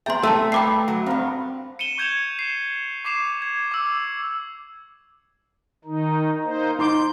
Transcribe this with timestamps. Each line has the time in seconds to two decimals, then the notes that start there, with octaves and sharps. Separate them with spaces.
0.06 B3 G#4 E5 G5 A#5 C6
0.23 A3 C4 A5 C6 E6
0.52 G2 B4 E5 G5 A#5 D6 C7
0.88 F#3
1.06 G2 B3 C4 F5 A#5
1.79 C#7 D#7 E7 G7
1.98 C#6 G6 G#6 C#7 E7 F7
2.39 C7 E7
3.04 C#6 D6 C7 E7 F7
3.42 G#6
3.72 D6 E6
5.85 D#3 D#4
6.44 A#3 D#4 C5
6.79 D#4 C6 D6 G6